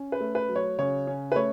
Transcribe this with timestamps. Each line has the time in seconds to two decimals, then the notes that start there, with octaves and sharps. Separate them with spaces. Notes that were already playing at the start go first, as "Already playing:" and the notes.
Already playing: C#4
0.12 B4
0.20 A3
0.35 B4
0.49 F#3
0.56 C#5
0.79 C#3 C#5
1.07 C#4
1.32 B4
1.36 A3 C#5